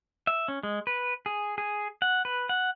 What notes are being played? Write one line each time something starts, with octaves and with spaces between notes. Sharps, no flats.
E5
C#4
G#3
B4
G#4
G#4
F#5
B4
F#5